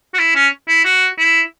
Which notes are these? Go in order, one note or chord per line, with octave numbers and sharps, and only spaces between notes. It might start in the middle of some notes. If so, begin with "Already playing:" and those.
F#4
E4
C#4
E4
F#4
E4